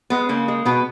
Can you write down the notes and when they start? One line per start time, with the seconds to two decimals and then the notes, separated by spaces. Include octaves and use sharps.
0.10 G#3 B3
0.29 C#3 A#3
0.48 G#3
0.65 B2 B3